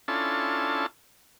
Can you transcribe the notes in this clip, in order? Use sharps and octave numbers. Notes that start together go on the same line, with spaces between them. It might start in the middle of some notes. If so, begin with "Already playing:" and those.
C#4 D4 E4 F4 A4 A5